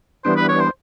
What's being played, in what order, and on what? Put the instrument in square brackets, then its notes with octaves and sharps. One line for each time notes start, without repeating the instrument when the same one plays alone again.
[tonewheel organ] E3 G3 B3 D4 [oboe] C5
[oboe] B4
C#5
C5